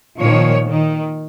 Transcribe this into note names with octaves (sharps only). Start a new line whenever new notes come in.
A#2 D#3 F3 C#5
D#3